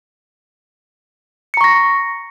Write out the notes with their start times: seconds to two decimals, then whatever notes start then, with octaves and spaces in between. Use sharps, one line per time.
1.54 C#7
1.57 A#5
1.61 C#6
1.64 A#6